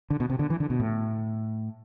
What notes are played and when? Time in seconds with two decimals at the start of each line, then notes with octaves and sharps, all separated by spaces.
0.10 D3
0.20 B2
0.30 C3
0.39 D3
0.50 E3
0.60 D3
0.70 B2
0.80 A2